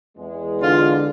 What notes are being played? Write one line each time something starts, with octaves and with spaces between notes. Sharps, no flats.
E2 G#3
D3 F4